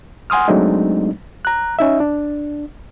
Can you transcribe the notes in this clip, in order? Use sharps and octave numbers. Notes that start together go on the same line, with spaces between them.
F#5 G#5 C6 D#6 F6
F#3 G#3 A3 C4 D4 D#4
A#5 F#6
C#4 D#4 E5
D4